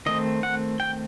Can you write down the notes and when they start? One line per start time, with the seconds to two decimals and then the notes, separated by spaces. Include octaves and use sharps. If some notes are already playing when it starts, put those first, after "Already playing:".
0.06 D#3 A3 C4 D#5
0.43 F#5
0.80 G5